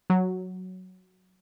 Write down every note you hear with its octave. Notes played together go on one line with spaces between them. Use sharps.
F#3